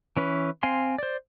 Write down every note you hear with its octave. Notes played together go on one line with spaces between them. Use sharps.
E3 C#4 B4
C4 F5 G#5 C6
C5 D5